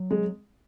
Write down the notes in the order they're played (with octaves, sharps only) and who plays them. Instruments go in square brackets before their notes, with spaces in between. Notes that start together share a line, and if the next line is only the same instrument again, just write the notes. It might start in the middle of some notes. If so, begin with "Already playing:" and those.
Already playing: [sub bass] F#3
[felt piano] G#3